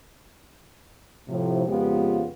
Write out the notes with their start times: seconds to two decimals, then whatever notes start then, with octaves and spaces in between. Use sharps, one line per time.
1.28 A2 C3 F3
1.66 F2 C#3 G#3 B3 F4 G4